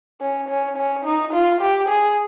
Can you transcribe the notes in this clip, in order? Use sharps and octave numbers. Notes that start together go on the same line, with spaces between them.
C#4
C#4
C#4
D#4
F4
G4
G#4